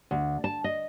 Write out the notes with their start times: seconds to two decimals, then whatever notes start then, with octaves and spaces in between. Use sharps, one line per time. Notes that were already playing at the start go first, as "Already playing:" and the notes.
0.11 D2
0.44 A5
0.64 D#5